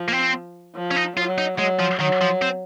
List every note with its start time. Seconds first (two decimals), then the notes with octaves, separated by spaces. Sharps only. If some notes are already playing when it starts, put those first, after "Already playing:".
Already playing: F3
0.08 A#3
0.13 C4
0.75 F3
0.91 C#4
0.96 D#4
1.17 F#3 F4
1.38 D#4
1.58 F#3 G#3
1.80 F3
2.00 D#3 F#3
2.21 F3
2.42 C4